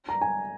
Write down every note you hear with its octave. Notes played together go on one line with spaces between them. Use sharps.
A#5
G#5